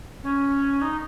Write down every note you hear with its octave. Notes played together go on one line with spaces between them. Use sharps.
C#4
D#4